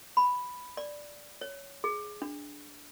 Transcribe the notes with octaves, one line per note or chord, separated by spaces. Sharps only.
B5
D5
C#5
G#4
D4